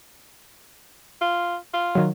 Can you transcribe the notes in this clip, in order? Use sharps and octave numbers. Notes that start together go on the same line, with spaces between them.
F4
F4
D#3 F#3